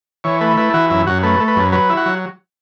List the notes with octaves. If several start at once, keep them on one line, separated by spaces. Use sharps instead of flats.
E3 C#5
A3 B4
E4 B4
E3 F#4
F#2 E4
F#2 F#4
A3 B4
A3
B4
F#2
F#3 B4
E4
F#4
F#3